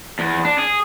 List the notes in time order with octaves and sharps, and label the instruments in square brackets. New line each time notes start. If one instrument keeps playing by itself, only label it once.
[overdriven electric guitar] E2
D4
G#4